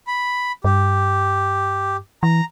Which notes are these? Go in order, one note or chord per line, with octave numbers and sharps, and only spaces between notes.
B5
G2 G4
E3 A#5